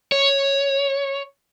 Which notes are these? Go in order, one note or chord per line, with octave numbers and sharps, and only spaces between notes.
C#5